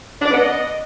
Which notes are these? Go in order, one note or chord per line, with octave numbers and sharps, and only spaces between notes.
D4
D5
B3
D#5